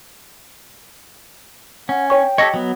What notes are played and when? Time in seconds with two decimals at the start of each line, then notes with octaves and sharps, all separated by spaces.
1.89 C#4 F#5
2.10 C#5 G5 C#6
2.38 G4 A4 C#5 D#5 A#6
2.54 F#3 B3